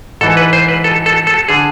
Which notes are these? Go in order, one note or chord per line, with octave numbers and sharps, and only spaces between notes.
G#2 E3 A4
B4
C5
B4
A4
A4
A4
D3 G#4